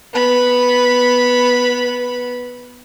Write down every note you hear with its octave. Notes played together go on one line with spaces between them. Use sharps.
B3 B5